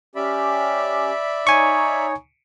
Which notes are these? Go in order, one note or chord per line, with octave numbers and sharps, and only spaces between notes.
C#4 G4 D5 E5 B5
D#4 C#5 G#5 C#6